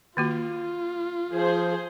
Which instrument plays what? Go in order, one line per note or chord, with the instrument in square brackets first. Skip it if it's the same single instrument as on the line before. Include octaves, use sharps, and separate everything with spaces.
[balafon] D#3 A#3 F#4 [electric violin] F4
[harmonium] F3 [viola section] G#4 C5